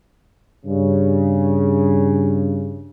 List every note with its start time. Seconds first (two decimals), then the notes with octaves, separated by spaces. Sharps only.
0.66 G2 C#3